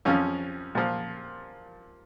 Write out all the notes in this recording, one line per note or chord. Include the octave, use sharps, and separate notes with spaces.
F2 F3 C#4
A#2 F3